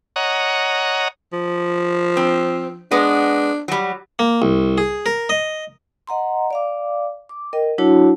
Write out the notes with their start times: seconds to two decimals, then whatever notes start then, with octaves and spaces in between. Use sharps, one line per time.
0.16 C#5 D#5 F#5 A#5
1.33 F3
2.17 C4
2.91 G#3 B3 D4
3.68 F#3 G3
4.19 A#3
4.42 C2
4.78 G#4
5.06 A#4
5.29 D#5
6.07 D#5 F#5 A#5 C6
6.51 D5 F5 D6
7.29 D6
7.53 A#4 D#5 G5
7.78 F#3 D4 E4 F#4 C#5 A5